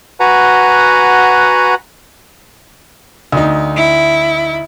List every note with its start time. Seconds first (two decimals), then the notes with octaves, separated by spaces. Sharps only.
0.20 F#4 B4 F#5 G#5 A#5
3.32 D2 D#4
3.76 E4